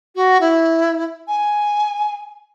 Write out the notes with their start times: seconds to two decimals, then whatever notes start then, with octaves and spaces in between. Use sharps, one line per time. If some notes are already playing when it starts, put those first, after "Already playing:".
0.15 F#4
0.40 E4
1.27 G#5